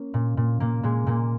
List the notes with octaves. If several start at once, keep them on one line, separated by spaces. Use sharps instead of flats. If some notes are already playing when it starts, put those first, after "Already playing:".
Already playing: A#3 C#4
A#2
A#2
A#2 A#3
A#2 G#3
A#2 A#3